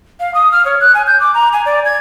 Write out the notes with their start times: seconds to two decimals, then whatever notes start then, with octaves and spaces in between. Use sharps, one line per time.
0.20 F5
0.34 D#6
0.52 F6
0.65 C#5
0.81 F#6
0.94 G#5
1.07 G6
1.20 D6
1.34 A#5
1.53 G#5
1.66 D5
1.85 G#6